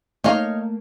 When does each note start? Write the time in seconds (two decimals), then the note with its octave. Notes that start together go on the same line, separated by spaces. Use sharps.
0.24 A3 A#3 D#4 C#5 F5